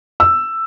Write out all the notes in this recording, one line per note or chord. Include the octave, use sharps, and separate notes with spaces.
E6